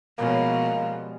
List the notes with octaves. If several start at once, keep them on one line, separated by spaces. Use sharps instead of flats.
B2 F3 G3 G#3 A#3 B3 C#4